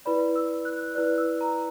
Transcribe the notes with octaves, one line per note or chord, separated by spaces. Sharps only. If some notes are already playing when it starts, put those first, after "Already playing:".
E4 B4 D5 B5
E6
F#6
E4 B4 D5 F#6
E6
A#5